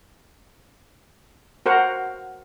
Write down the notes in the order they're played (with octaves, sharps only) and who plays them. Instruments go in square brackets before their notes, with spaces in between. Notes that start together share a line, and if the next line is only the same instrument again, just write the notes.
[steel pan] F#4 A#4 C5 F#5